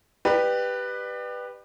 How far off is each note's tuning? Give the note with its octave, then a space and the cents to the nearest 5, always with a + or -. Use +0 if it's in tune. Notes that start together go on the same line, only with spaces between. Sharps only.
G4 +0 B4 +0 D5 +35